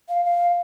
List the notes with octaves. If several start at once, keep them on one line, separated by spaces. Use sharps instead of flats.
F5
F5